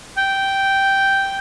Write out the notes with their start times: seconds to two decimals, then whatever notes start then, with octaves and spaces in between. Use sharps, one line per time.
0.17 G5